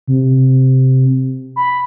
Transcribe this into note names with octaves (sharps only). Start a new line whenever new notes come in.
C3
B5